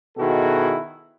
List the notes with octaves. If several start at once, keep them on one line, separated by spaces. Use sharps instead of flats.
B2 D#3 E4 F#4 G#4 A4